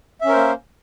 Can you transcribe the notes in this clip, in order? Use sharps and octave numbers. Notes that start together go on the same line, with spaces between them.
A#3 C#4 A#4 C5 E5